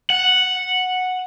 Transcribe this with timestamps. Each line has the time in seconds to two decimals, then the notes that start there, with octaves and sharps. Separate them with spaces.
0.10 F#5